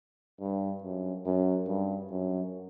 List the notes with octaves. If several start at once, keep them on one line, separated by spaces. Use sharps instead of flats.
G2
F#2
F#2
G2
F#2